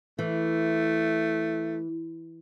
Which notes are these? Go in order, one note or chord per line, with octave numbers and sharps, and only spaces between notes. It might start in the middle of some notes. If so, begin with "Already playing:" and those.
E3 A3